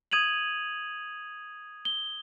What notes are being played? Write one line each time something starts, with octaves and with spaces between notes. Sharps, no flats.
D#6 G#6 D#7 F7 F#7
G7